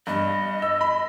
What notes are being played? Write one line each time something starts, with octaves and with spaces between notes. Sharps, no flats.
G2 D#5
E6
B5